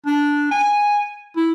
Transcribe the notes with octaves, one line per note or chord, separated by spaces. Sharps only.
D4
G#5
E4